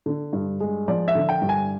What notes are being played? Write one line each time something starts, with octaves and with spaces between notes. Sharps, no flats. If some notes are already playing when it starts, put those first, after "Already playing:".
D3
G2
G#3
F3 D5
E5
D3
G5
G2
G#5